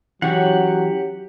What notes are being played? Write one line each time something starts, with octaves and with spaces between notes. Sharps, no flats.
E3 F#3 C#4 F#4 G4 F#5